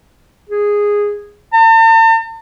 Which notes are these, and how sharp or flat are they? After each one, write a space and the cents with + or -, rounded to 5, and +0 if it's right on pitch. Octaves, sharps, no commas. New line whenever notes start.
G#4 -10
A5 +45